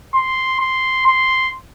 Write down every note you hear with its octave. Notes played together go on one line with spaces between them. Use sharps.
C6
C6
C6